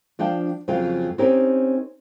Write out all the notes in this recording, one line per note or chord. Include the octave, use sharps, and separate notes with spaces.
F3 D4 F5 G5 A5
F2 C#3 F#3 F4 F5 G5
C4 C#4 D#4 G4 A#4